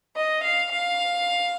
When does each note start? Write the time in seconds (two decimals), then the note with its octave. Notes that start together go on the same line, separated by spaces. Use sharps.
0.16 D#5
0.44 F5
0.72 F5